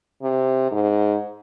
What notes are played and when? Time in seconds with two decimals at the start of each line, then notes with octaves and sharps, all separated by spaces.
0.22 C3
0.71 G#2